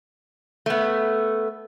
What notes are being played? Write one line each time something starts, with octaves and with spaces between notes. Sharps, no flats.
A3 B3